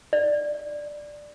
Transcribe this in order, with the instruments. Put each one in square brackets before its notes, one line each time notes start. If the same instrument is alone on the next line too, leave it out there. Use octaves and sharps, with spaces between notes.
[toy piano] D5